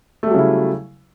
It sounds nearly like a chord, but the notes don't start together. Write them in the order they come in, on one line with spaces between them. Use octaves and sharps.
A3 G3 F#3 C#3 E4